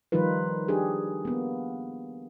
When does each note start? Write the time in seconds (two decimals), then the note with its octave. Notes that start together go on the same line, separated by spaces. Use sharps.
0.12 D#3 F3 G3 D#4 F4 B4
0.68 D4 G4 G#4
1.25 A#3 B3